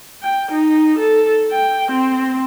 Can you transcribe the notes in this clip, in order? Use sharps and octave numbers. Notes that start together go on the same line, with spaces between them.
G5
D#4
A4
G5
C4